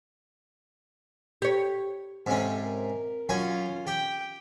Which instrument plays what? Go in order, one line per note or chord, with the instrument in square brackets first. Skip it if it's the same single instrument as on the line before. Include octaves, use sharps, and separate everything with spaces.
[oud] G4 C#5
[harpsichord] G#2 C3 C#4 [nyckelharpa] C4 A4
[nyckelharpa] A#4
[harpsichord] F#2 C#5 G#5 [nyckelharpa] C#4 F4
[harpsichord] G4 [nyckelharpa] G5